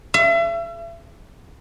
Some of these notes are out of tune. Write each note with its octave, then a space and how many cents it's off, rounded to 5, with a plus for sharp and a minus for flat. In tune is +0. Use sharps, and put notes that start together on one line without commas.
E5 +40